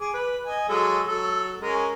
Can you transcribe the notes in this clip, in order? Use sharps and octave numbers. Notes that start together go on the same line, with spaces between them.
G#4 D6
B4
D#5 G#5
F#3 G#3 A4
F#3 A4
G#3 C#4 A#4